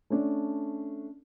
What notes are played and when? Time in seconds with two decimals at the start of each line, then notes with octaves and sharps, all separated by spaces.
0.10 A3 C#4 D4